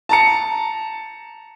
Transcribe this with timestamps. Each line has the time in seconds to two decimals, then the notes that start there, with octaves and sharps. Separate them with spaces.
0.09 A5 A#5 C#7